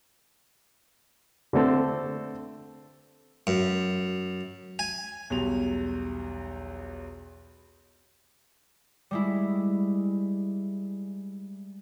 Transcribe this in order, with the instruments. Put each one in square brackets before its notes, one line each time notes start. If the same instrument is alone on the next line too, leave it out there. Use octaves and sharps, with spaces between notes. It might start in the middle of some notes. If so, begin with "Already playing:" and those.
[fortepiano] D3 A3 C4 A4
[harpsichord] F#2
G#5
[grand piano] B1 E2 G3 F7
[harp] G3 G#3 E4